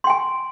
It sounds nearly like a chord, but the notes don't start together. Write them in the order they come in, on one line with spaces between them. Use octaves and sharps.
C6 G5 G#5